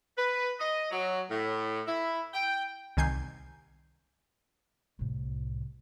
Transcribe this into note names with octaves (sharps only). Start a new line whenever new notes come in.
B4
D#5
F#3
A2
E4
G5
C2 D#3 G#5 G6 C7
C2 A2